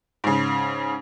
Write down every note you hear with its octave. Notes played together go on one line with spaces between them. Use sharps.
G#2 C#3